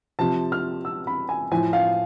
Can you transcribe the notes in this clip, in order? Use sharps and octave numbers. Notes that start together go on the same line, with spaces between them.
C3 F3 A5
F6
E6
B5
G#5
A2 F3 G#5
F5